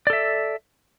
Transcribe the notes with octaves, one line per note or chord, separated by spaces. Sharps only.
A4 D5 E5